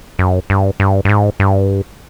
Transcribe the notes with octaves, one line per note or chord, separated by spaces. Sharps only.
F#2
G2
G2
G2
G#2
G2